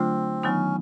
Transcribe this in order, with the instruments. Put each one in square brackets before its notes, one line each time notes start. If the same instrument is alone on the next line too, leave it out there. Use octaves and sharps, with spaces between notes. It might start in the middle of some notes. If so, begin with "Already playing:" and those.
Already playing: [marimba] D3 F#3 A3 D4 F4 [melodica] C4
[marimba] D#3 F#3 B3 D#4 [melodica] C#4